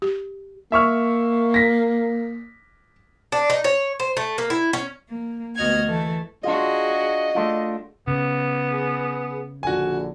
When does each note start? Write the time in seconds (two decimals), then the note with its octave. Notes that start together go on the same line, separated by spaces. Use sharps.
0.02 G4
0.72 A#3 E5 C#6 F6
1.54 A#6 B6
3.32 D4
3.50 D#4
3.64 C#5
4.00 C5
4.17 A3
4.38 A#3
4.50 E4
4.73 C#4
5.08 A#3
5.56 D2 B3 F#4 D#5 F6 G#6
5.85 E3 A3
6.44 D4 F4 F#4 G#4 D#5
7.35 A3 D4 F4
8.07 C#3 B3
8.72 G#4
9.63 A#1 D3 F#4 G#5